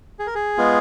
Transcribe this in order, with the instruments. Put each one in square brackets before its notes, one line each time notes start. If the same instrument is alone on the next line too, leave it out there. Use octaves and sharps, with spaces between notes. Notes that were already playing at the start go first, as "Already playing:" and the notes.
[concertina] G#4
A#4
G#4
G#3 B3 F4